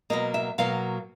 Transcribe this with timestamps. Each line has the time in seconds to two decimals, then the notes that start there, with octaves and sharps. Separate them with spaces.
0.10 B2 F#3 A#3 D#5
0.34 E5
0.58 B2 F#3 A#3 F5